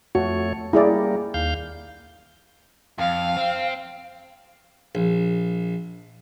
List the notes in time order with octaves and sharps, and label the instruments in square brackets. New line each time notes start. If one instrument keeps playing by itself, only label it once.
[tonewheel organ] F2 A3 C#5 [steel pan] F#4
[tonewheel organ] G3 A#3 [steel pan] E4 G#4 D5
[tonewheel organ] D#2 F5 G6
[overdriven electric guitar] F2 [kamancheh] F5
[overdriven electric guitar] C4
[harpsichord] A#1